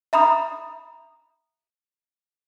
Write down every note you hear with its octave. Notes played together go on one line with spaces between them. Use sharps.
E5 A#5 B5 D#6